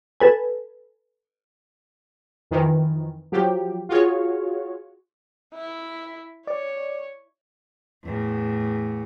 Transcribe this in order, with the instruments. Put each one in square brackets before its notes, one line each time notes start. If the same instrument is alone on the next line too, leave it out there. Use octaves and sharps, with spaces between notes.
[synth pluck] A4 B4 G#5
[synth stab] F2 D#3 E3
F3 F#3 G4
F4 F#4 G#4 C#5
[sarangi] E4
[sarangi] C#5 [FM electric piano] D5
[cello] E2 A2